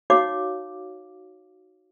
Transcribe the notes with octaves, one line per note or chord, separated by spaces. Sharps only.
D#4 F#4 C#5 F5 D6